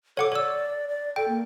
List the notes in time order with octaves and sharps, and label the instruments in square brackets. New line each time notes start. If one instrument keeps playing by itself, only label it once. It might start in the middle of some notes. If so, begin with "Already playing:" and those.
[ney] A4 [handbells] C#5 F#5 D6
[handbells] C#5 E6 [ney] D5
[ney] D5
[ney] A4 [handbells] G5
[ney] A#3